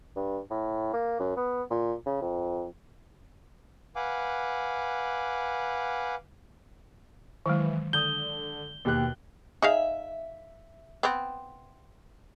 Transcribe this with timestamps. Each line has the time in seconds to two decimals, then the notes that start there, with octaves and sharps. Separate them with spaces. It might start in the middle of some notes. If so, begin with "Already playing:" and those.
0.16 G2
0.51 A2
0.94 A#3
1.20 F#2
1.37 B3
1.70 A#2
2.06 C#3
2.21 F2
3.96 B4 F5 F#5 G#5 D6
7.46 D#3 E3 F#3 G#3
7.93 D3 D#6 G6 G7
8.85 D#2 B2 G4 F#6
9.62 D#4 G#4 E5 F5
11.03 B3 C4